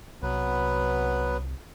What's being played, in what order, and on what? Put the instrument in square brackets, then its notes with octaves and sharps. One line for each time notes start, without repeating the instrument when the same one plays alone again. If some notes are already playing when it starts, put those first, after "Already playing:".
[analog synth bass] C2 [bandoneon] F#3 B3 B4